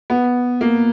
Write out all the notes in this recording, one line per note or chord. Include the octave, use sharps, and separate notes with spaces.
B3
A#3